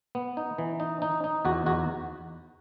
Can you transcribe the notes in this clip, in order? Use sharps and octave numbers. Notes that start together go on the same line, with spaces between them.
B3
D#4
E3
D#4
D#4
D#4
E2 F#4
E2 F#4